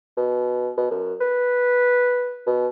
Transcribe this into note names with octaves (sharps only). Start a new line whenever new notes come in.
B2
B2
F#2
B4
B2